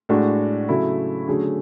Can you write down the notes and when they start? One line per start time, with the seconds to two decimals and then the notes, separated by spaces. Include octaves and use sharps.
0.09 A2 G#3 D4 F#4
0.69 C#3 F#3 A3 E4
1.28 D3 F#3 A3 C#4 G#4